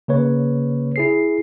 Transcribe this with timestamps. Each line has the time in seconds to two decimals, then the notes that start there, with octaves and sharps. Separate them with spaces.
0.08 C#3 A#3 B4 C#5
0.96 E4 G#4 C7